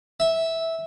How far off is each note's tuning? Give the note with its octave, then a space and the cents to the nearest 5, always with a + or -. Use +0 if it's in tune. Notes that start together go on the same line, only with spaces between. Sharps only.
E5 -10